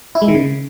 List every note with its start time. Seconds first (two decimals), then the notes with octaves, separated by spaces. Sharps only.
0.15 E4
0.22 G#3
0.28 D#3
0.35 C#3